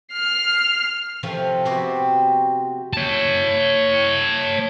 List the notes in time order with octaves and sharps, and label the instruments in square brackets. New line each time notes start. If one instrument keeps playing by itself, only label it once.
[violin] F6 C7
[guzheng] C3 F3 A3 C4
C3 B3 C4 F#4 G4 C5
[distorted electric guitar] C#5 A5